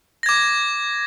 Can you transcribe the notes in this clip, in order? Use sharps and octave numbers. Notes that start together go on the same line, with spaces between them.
D6 G#6 A#6